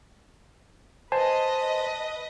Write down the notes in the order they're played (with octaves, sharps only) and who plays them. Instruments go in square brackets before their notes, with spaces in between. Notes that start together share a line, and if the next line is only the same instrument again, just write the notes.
[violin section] B4 D#5 [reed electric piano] C5 G#5 C6 [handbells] A5